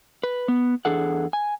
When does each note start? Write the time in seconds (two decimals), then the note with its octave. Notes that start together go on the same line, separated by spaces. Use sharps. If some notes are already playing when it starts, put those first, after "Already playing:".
0.23 B4
0.48 B3
0.85 E2 D4 G#4 A4 F#5
1.33 G#5